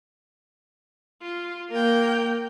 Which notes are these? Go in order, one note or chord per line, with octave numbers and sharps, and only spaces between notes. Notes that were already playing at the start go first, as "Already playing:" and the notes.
F4
A#3 A#4 G5